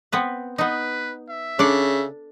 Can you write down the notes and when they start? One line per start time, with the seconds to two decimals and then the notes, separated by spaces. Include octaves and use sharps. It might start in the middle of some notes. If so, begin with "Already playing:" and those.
0.12 B3 C4 B4
0.58 B3 D#4 B4
1.30 E5
1.59 C#3 D4 A4 D5